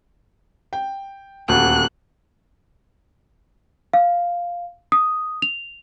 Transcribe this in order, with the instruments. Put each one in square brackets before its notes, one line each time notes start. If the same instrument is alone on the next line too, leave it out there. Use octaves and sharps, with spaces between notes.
[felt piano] G5
[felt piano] D#1 D2 [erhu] F#6
[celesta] F5
D#6
F7